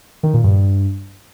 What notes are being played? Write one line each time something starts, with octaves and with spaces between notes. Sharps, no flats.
D#3
A#2
G2